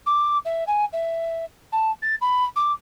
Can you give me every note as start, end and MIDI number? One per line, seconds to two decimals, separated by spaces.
0.06 0.37 86
0.45 0.64 76
0.67 0.85 80
0.93 1.45 76
1.72 1.91 81
2.02 2.15 93
2.21 2.44 83
2.56 2.72 86